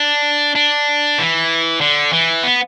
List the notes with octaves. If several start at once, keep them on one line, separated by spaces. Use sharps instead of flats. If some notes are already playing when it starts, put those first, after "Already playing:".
Already playing: D4
D4
E3
D3
E3
B3